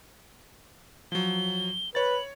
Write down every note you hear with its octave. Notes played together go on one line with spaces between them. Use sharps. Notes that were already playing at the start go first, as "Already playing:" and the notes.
F3 F#3 G7
B4 C#5 A6 F#7